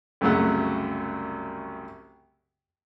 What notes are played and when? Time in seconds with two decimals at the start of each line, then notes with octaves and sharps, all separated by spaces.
0.21 C2 F#2 C#3 F#3 A3 F#5